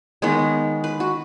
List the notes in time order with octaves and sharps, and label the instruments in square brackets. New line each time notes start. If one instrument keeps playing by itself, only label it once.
[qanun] D#3 G#3 B3 C#5
B4
F#4